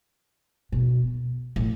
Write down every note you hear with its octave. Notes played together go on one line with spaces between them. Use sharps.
B2
A2